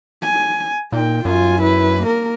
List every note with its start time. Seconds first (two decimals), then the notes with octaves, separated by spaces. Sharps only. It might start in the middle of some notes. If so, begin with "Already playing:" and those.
0.22 G#5
0.92 A#2 D#4 G5
1.25 F#2 F4 G#5
1.62 E4 B4
2.03 A#3 A#4